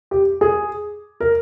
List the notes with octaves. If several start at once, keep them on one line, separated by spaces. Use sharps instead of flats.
G4
G#4
A#4